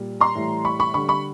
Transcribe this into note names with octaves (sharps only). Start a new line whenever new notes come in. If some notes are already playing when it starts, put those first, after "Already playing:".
Already playing: A#2 G3
A#5 C6
A2 E3 G3
B5 C#6
B5 C#6
D3 G3 B5 C#6
B5 C#6